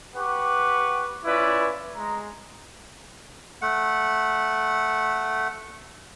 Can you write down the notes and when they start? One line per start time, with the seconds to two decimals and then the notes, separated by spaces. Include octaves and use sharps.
0.16 G4 B4 F#5 C#6 D6
1.25 C#4 E4 F4 B4 D5
1.96 G#3 A#5
3.62 A3 F#5